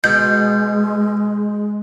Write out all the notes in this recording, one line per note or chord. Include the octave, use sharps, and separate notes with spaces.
B2 G#3 G6